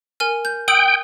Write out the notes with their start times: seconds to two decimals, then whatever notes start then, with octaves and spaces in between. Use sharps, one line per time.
0.20 A#4 G#5 F6
0.45 G6
0.68 G5 D#6 E6 F#7